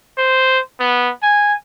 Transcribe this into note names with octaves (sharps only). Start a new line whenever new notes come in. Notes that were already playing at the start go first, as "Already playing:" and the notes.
C5
B3
G#5